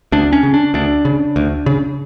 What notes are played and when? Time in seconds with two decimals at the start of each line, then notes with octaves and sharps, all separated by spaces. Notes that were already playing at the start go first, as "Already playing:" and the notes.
0.12 D2 D4
0.33 C#4
0.43 C#3
0.54 D4
0.74 D2 D4
1.05 C#3
1.36 D2
1.66 C#3